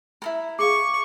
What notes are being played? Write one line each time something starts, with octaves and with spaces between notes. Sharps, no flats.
E4 A4 A#4 B5
G#4 F5 C#6 D6